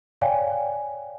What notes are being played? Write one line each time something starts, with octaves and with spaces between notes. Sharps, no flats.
C#5 D5 F5 G5 G#5